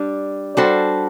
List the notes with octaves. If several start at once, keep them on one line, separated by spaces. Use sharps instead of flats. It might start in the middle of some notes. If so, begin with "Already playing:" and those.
Already playing: G3 D4
G3 D4 F#4 A4 C5